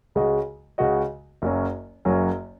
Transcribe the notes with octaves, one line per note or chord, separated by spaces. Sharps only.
C#2 C#3 G#3 F#4 D#5
C#2 C#3 G#3 F#4 D#5
F#1 F#2 F#3 C#4
F#1 F#2 F#3 C#4